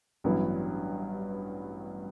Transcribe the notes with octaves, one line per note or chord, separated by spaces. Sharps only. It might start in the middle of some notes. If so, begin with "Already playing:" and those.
A1 G2 F#3 B3 E4